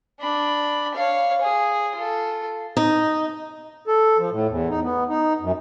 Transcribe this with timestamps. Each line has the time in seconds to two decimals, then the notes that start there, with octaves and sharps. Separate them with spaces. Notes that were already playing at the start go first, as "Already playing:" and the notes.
0.21 D4 B5
0.94 C#5 F5
1.42 G#4
1.95 F4 A4
2.77 D#4
3.88 A4
4.18 F3
4.32 A2
4.48 E2
4.70 D#4
4.83 B3
5.09 D#4
5.40 F#2